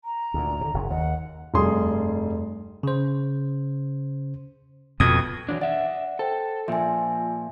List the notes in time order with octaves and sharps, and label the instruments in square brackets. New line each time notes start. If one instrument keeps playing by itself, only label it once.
[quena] A#5
[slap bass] D2 A#2
B2 D3
F#1 C#3
[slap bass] D#2 [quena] F#5
[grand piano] F1 G2 G#4 C6
[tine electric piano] C#3 C5
[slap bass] F2 B2 [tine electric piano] D#6 G#6
[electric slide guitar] E3 F#3 D4
[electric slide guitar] D5 E5 [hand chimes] F#5
[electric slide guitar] A4 [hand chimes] C5 G5
[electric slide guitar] A#2 F3 [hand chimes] E5 G#5